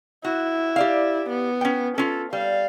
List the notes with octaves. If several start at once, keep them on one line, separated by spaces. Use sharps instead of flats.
E4 F#4
G4 D5 F5
B3
C#4 G5
C#4 F4 A4
G3 F5